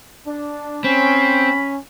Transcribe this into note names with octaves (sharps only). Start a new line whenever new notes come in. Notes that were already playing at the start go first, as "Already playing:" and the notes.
D4
C4 C#4 B5